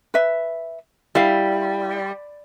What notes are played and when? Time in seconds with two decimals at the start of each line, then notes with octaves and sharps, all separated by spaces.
0.14 B4 E5
1.15 G3 E4 E5 F5